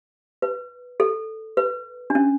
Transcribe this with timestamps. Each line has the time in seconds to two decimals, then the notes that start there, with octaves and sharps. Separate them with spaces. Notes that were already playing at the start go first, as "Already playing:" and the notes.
0.42 B4
1.00 A4
1.57 B4
2.10 D4
2.15 C#4